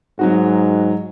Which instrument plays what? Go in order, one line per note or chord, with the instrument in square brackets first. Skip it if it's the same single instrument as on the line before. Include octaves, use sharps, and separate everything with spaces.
[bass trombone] G#2 [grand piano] F#3 D#4 F#4